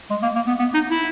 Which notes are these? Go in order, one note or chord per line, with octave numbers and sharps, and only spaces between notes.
G#3
A#3
A#3
B3
B3
D#4
E4